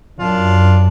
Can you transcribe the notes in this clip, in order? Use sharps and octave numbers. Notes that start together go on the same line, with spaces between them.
F#2 D4 F4